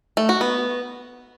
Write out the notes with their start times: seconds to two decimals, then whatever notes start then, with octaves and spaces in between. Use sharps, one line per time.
0.17 A3
0.29 F#4
0.41 B3